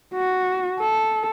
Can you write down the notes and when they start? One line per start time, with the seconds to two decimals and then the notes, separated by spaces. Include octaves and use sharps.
0.15 F#4
0.80 A4